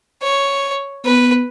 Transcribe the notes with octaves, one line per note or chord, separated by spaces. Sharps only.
C#5
B3 B4